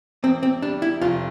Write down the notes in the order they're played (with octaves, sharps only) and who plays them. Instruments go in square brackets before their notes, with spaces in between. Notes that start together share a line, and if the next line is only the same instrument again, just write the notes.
[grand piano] E2 [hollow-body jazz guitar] C4
[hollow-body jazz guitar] C4
[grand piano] G3 [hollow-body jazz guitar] D4
[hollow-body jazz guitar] E4
[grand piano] F1 [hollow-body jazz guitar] F4